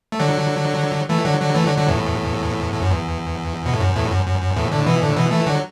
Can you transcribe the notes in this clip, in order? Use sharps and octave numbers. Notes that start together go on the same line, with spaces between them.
A3
D3 F#3
E3 A3
D3 F#3
D3 F#3
E3 A3
D3 F#3
D3 F#3
E2 A2
A2
F#2
E2
B2
A2
F#2
E2 A2
F#2
F#2
F#2
E2 A2
A2 D3
B2 E3
A2 D3
B2 E3
E3 A3
D3 F#3